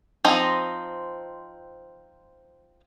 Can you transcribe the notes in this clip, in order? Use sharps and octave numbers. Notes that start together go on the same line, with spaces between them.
F3 C4 D#4 D#5 A#5